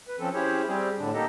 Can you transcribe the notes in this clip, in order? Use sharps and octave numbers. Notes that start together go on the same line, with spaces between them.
B4
F3 C4 C#4 A4
C#4 E4 G4 G#4 C5 C#5
G3 C4 G4 G#4
A2 D3 D4
A#3 D#4 G4 A4 D#5